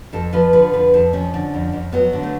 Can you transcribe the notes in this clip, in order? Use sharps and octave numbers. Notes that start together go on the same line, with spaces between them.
F2 A4
F3 B4
D3 B4
F2 B4
F2 A4
F3 C#4
D3
F2
F2
F#3 B3
D3
A3